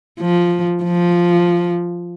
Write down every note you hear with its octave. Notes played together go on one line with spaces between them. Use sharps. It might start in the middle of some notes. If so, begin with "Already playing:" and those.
F3
F3